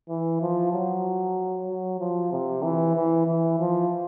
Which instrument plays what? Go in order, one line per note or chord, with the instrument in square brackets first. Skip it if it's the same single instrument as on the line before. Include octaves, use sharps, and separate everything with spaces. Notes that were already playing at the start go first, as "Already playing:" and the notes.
[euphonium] E3
F3
F#3
F#3
F3
C3
E3
E3
E3
F3